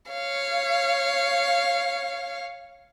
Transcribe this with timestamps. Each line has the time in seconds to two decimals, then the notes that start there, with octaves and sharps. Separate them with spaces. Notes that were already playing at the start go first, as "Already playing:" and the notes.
0.11 C#5 F5